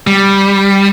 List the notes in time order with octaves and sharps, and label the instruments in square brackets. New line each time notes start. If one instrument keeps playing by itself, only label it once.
[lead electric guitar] G3